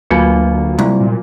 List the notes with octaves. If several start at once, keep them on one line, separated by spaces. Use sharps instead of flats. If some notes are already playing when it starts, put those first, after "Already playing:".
D2 F#3 A#3 F4 F#4 G#5 C#7
C2
A#2